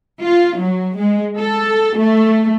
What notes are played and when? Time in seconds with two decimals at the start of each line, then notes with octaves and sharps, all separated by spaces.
0.22 F4
0.60 F#3
0.98 G#3
1.37 A4
1.97 A3